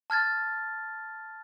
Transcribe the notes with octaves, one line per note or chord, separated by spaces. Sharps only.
A5 F6 G#6 A6